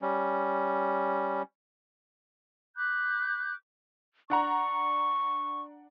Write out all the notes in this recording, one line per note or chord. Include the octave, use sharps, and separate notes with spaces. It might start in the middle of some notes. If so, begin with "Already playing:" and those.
G3 C#4
B5 D6 F#6 G6
D4 F#5 A#5 C#6